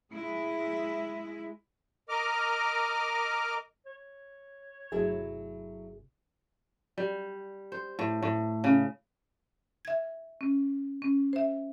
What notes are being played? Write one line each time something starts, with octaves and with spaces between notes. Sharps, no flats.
G#3 E4
A#4 D#5 D6 F6
C#5
G1 C3 F#3 A3 E4 G#4
G3
C5
A2
A2
C#3
E5 G#6
C#4
C#4
C5 E5